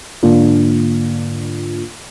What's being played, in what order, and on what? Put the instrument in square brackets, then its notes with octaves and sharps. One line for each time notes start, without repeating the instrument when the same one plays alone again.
[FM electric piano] G#2 D3 A#3 D4 F4